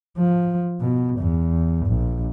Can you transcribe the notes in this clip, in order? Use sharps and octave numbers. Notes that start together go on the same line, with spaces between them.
F3
B2
E2
A#1